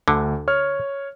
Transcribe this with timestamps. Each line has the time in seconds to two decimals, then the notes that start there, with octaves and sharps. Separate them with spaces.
0.08 D2 D3
0.48 C#5 F6